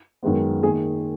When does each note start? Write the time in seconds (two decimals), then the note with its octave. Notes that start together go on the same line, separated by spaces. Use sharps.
0.23 F#2 D#3 G#3 B3
0.63 D#3 A#3 G#4